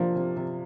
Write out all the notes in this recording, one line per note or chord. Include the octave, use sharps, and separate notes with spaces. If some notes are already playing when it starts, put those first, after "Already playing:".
Already playing: C3 F3 A#3 D4
C3
C3